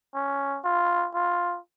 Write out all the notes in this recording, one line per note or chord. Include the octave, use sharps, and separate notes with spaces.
C#4
F4
F4